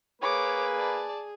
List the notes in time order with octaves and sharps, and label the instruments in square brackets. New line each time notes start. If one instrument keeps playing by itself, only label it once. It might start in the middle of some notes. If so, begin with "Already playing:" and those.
[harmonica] A#3 B4 [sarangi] G#4 [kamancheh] C#5 D6
[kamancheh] D5 A5